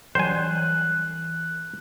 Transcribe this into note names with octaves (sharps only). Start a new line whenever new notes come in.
E3 F#3 G3 C5 G#5 F#6